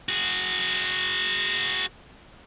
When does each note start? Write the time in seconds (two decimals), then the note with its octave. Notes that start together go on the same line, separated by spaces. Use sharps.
0.09 F#4 G#4